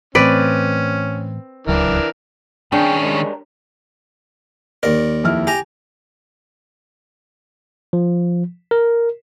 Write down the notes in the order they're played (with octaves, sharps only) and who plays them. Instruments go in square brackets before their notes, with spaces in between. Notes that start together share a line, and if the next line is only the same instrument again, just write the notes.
[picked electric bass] A2 E3 A3 [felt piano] C4 [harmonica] C#4 [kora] B4 D5
[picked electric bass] D1 C#2 F#3 [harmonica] E3 D4 A#4
[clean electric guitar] G2 G#4 [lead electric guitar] D#3 C#4 [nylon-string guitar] D4 [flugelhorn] G5
[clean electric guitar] G3 A#4 C#5 [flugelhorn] G#3
[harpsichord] D#2 A#4 [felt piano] D5
[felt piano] F2 E4 F6
[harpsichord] G4 A#5 [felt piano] G#5
[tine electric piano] F3
A#4